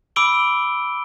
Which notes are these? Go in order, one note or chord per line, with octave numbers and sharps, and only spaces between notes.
B5 D6 E6 D7 G7